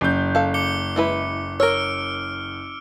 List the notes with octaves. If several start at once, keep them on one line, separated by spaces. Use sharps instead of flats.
F#1 G6
A4 F5
D6 C#7 G7
G#3 E4 B4
A#4 C#5 E6 F6 D7